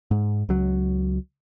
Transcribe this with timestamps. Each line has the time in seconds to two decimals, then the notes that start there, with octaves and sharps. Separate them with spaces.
0.11 G#2
0.49 C#2 F#3